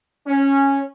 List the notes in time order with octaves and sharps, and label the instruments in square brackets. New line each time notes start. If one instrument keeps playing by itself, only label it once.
[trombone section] C#4